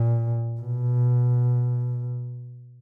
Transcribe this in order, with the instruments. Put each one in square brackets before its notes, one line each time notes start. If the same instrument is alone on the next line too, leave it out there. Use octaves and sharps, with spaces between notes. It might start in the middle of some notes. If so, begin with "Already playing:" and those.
Already playing: [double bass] A#2
B2